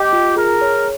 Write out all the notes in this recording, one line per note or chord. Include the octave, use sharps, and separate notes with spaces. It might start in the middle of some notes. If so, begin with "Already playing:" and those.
Already playing: G4 D#5
F4
G#4 A#4
C#5